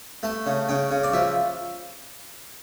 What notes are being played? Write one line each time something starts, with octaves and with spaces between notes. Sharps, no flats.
A3 A5
C#3
C#3 G5
C#3
D5
F3 E5